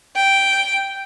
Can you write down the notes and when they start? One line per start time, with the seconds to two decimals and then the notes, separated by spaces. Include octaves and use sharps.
0.15 G5